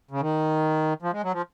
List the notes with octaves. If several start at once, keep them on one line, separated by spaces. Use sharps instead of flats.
C#3
D#3
F3
G#3
F#3
F3